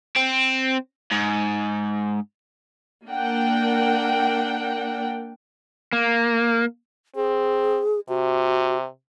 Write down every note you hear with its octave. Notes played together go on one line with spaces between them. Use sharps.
C4
G#2
A#3 D4 A#4 F#5 G5
A#3
C4 G#4
C3 F#4